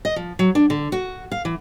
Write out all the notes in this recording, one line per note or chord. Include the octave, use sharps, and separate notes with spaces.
D#5
F3
F#3
D4
D3
F#4
F5
E3